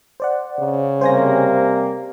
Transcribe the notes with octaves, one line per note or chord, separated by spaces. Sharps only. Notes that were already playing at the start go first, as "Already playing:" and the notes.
C5 D5 F#5
C#3
C3 G3 A#3 C5 G#5 A#6